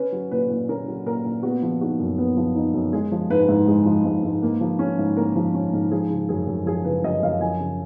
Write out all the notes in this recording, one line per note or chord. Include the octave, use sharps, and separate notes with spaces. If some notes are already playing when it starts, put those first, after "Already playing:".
Already playing: C#4 B4
F#3
A#2 B4
A#2
C#4 A#4
F#3
A#2 A#4
A#2
B3 F#4
F3
D#4 F#4
F#2
B3
F3
D#4
F#2
G#3 G#4
F3
G#2 B4
G#2
G#3
F3
G#2
G#2
A#3
F3
C#4
G#2
A#3 A#4
F3
C#4
G#2
F3 G#4
C#3
F#2 G#4
F#2
F3 G#4
C#3 B4
F#2 D#5
F#2 F5
F3 G#5
C#3